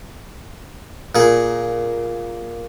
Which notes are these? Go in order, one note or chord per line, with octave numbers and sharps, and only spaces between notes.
A#2 G#4